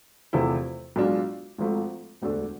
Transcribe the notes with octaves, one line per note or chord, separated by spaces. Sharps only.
E2 C3 F3 A3 E4
B1 B2 G#3 D4 F4
G#1 G#2 F3 A3
E1 D2 D3 A3 D4